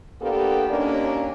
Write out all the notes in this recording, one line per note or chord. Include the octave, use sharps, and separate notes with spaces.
A#3 B3 D4 F4 G4 A4
D#2 A#3 C#4 D4